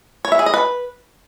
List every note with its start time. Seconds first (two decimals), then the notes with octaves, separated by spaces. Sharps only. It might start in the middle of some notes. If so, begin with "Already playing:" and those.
0.25 C#5
0.32 E5
0.39 G#4
0.46 D#5
0.54 B4